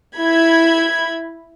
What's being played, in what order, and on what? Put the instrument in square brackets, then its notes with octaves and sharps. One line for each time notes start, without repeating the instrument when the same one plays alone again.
[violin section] E4 B5 G#6